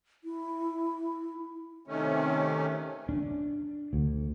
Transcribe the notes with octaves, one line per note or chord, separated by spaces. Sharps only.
E4
C3 D#3 A3 C#4
D4
D2